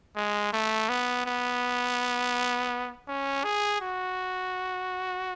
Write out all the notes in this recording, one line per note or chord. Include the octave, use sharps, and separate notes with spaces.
G#3
A3
B3
B3
C#4
G#4
F#4